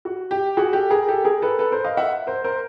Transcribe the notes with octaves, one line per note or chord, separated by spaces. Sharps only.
F#4
G4
F#4 G#4
G4 A4
G#4 A#4
G4 A4
G#4 A#4
A4 B4
A4 B4
A#4 C5
D#5 F5
E5 F#5
A#4 C5
A#4 C5